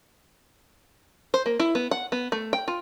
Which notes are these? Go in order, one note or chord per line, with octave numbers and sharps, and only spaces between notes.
C5
A#3
E4
B3
F#5
B3
A3
G5
F4